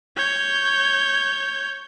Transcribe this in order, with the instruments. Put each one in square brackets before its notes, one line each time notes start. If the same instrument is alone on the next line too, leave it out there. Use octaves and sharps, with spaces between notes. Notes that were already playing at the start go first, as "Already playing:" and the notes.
[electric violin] C#5 G6